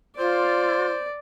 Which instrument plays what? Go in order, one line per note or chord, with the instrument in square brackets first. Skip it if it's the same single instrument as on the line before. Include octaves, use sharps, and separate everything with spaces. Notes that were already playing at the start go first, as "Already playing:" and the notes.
[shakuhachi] F4 [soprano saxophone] C5 [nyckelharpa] D5